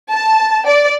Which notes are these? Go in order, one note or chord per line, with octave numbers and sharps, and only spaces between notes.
A5
D5